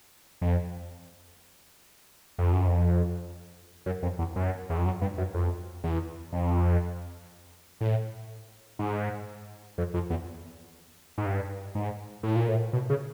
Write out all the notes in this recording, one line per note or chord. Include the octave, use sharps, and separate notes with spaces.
F2
F2
F#2
F2
F#2
F2
E2
F#2
E2
F2
F#2
G2
F#2
F2
E2
F2
A2
G#2
F2
F2
E2
G#2
G2
G#2
A2
A#2
A2
B2
C#3